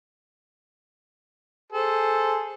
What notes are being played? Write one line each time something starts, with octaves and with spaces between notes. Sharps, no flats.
G#4 A4 C5